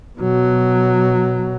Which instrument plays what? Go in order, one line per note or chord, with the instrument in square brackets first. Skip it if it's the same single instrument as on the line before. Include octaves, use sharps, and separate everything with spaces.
[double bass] B2 F#3